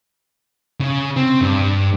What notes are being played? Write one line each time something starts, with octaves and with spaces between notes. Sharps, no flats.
C#3
C4
G2